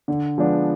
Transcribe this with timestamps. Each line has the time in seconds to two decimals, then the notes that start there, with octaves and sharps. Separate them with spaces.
0.08 D3
0.38 F3 G#3 B3 D4